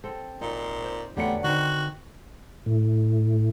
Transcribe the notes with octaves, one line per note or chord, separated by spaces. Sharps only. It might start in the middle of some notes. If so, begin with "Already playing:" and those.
C4 A4 G5
G#1 A#2 D#4
C5
E2 D3 F#3 G3 A3 B3 C#7
D3 D#3 C4 F#4
A2